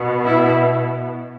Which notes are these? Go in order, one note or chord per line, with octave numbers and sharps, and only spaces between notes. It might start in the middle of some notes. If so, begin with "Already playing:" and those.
Already playing: B2 B3
E4